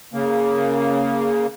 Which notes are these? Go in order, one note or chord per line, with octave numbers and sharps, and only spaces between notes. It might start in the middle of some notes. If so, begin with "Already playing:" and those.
C#3 A#3